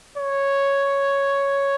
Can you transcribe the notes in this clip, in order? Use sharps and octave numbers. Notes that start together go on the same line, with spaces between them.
C#5